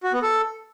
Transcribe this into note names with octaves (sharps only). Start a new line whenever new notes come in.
F#4
B3
A4